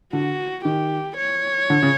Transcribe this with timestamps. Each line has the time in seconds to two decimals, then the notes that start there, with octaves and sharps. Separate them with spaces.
0.13 D3 F#4
0.65 D#3 G4
1.17 C#5
1.70 D3
1.83 C#3